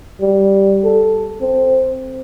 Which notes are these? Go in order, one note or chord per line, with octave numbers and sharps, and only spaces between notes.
G3
A4
C4